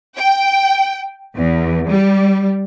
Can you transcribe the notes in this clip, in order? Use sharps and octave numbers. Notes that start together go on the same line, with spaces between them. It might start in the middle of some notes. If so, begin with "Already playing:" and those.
G5
E2
G3